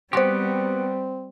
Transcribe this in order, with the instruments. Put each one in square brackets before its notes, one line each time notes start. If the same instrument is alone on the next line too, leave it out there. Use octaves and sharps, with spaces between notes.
[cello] G3 [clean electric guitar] B3 F#4 G4 [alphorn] C4 [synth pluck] C5 C6